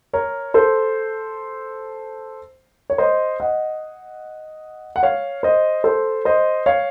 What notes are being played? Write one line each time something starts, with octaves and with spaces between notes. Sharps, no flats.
A#4 C#5
A4 C5
C#5
C5 D#5
D#5 F#5
F#5
C#5 F5
C5 D#5
A4 C5
C5 D#5
C#5 F5